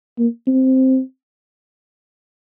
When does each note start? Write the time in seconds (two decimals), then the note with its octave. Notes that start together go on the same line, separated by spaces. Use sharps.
0.18 A#3
0.47 C4